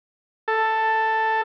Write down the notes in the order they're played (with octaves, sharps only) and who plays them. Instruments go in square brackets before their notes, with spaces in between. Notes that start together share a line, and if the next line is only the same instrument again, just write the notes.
[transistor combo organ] A4